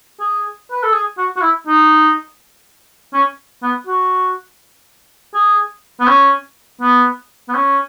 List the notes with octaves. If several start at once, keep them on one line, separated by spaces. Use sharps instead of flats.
G#4
B4
A4
G#4
F#4
F#4
E4
D#4
C#4
B3
F#4
G#4
B3
C#4
B3
B3
C#4